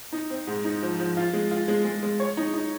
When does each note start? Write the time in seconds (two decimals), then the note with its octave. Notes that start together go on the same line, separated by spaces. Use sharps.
0.13 D#4
0.30 C4
0.47 G#2
0.65 D#4
0.83 F3
0.99 F3
1.17 F4
1.33 G#3
1.51 F4
1.68 G#3
1.85 G#3
2.03 G#3
2.20 C#5
2.37 D#4
2.54 D#4